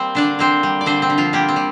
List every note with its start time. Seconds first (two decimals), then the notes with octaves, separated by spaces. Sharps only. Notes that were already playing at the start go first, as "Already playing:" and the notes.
Already playing: G3 A#3 C4 C5
0.15 D3 D4 D5
0.39 A#3 C4 C5
0.63 G3
0.81 D5
0.86 D3 C4 C5
1.02 C4
1.10 D3
1.18 F3 F4
1.33 G3 A#3 G4
1.48 C4
1.56 G3